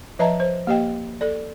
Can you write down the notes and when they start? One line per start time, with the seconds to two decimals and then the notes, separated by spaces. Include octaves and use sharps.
0.19 F3 B4 D#5 E5 A5 A#5
0.40 C5
0.67 A#3 G4 D#5 G5
1.21 A4 D5